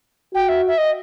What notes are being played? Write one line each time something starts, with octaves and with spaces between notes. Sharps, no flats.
F#4 G5
E5
E5
D#5